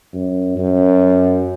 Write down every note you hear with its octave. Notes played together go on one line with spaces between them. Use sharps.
F#2
F#2